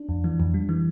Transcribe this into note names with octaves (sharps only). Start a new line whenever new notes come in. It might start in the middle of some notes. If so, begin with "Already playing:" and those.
Already playing: D4
F2
E3
F2
G3
E3